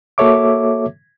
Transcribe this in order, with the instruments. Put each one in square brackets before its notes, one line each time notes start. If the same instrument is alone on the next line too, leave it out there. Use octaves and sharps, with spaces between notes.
[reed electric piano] A#3 F#4 A4 C#5 E5 D6